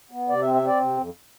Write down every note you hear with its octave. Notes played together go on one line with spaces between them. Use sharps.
B3
C3 D5
E5
C4
E5
C4 D5
C3
F2